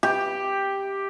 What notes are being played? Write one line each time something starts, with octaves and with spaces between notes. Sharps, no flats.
G4